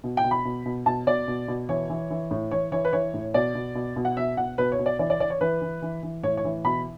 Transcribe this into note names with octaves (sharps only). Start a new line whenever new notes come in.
B2
G5
B2
B5
B2
B2
B2 A5
B2 D5
B2
B2
E3 C#5
E3
E3
A2
E3 C#5
E3 C#5
B4
E3 C#5
A2
B2 D5
B2
B2
B2
F#5
B2 E5
B2 F#5
B2 B4
C#5
B2
D5
E3 D5
D5
E3 D5
C#5
E3 B4
E3
E3
E3
A2 C#5
C#5
E3
B2 B5